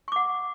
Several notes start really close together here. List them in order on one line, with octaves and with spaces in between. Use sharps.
C#6 D6 F#5